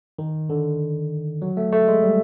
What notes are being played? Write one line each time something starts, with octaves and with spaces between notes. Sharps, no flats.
D#3
D3
F#3
A3
A3
G#3
G3